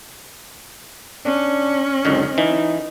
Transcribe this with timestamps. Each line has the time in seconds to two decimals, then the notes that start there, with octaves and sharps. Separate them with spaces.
1.25 C#4 D4
2.05 C#2 F#2 D3 D#4
2.38 E3 D#4